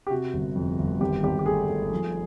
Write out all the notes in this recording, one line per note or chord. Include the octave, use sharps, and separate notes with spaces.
G4
C3 F#4
G1
F2
G1
G#1 G4
G#1 G4
G4
A3 G#4
A3
F3